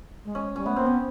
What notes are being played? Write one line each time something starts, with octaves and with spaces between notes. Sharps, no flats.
G#3
C#4
G3 C#4
A3 B3
A#3 C4
B3 C#4